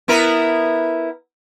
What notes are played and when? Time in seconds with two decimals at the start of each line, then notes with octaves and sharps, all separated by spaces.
0.08 B3 E4 A#4